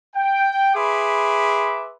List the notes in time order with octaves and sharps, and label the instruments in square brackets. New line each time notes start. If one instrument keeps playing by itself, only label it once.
[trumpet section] G5
G#4 B4 E5 B5 C6 D6